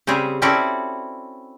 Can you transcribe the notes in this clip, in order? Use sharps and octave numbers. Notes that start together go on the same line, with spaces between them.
C#3 G3 C4 G#4
C4 C#4 E4 F#4 A4 D5